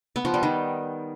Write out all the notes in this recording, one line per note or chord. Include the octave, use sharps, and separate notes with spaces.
B3
F3
G3
D#3